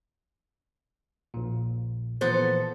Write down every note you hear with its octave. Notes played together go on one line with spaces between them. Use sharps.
A#1 A#2
A#2 E3 F3 B3 A4 C5